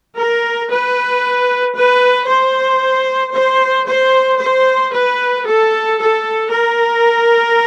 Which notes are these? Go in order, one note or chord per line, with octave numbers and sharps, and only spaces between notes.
A#4
B4
B4
C5
C5
C5
C5
B4
A4
A4
A#4